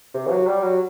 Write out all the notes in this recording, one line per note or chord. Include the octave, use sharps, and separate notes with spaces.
C3
E3
F#3
G3
F#3